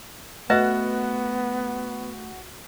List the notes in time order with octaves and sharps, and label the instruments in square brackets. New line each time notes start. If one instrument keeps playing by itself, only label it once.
[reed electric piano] A3 F#6 [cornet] B3 [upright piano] F#4 [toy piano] B4 D#5 E5